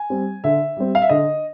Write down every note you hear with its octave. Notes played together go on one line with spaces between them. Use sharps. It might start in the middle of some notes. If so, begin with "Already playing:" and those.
Already playing: G#5
G3 C4
D3 E5
G3 C4
F5
E5
D3 D#5